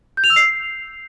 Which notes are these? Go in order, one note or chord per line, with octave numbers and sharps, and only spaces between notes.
G6
F7
E6
C7